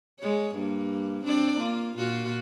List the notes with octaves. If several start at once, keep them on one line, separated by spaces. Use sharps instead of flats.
G#3 C#5
G2 A#3
C4 D4 D5
A#3 F4
A#2 F4 F#4